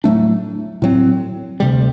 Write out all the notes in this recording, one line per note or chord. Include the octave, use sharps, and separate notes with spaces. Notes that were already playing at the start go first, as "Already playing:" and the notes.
A2 F#3 A3 D4
A2 F#3 C4
D2 C3 G3